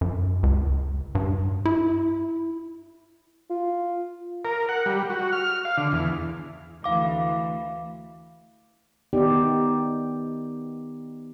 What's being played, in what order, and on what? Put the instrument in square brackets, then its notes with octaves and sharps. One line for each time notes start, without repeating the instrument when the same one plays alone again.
[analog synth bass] F#2
C#2
G2
E4
[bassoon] F4
[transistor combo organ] A#4
F#5
G3
F#4
F6
F5
D3
E2
[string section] D2 E3 [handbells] F5 D6
[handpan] D#3 B3 D#4 G4 D5